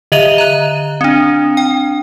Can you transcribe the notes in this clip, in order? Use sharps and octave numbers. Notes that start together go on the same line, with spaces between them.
D3 D#5 E5 D#7 F7
A#5 F#6
C4 D4
G5